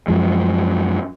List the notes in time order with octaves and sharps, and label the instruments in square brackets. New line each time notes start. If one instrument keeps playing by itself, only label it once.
[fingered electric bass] F#2 F3 G#3